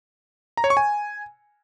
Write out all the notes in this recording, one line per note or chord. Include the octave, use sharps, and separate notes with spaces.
A#5
C#5
C#6
G#5